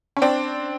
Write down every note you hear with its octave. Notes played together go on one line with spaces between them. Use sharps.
C#4
C4 D4